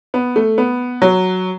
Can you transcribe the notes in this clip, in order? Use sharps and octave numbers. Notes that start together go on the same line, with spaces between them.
B3
A3
B3
F#3